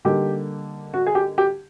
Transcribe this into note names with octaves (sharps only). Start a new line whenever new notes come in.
D3 G3 A#3 D#4 G4
F#4
G#4
G4
G4